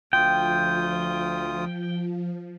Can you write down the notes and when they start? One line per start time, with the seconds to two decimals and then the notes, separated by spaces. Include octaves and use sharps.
0.13 D2 F3 F4 G5 D#6